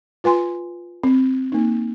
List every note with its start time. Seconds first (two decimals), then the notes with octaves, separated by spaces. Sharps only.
0.24 F4 B4 G#5 C6
1.03 C4
1.52 A#3 D#4